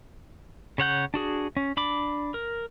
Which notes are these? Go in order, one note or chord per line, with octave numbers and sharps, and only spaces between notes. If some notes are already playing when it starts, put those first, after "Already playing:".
C#3 C#5 F#5 G6
D4 F#4 G#4
C#4
D4 B5 D6
A#4